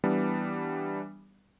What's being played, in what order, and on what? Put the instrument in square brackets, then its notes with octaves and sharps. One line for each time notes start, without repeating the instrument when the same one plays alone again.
[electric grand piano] E3 G3 B3 D4